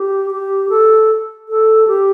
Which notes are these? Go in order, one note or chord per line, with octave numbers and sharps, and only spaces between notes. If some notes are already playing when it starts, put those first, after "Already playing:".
Already playing: G4
G4
A4
A4
G4